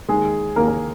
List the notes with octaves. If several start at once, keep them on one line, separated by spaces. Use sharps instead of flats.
D#2 D#3 G#3 G#4
D#2 D#3 A#3 A#4
A#3 A#4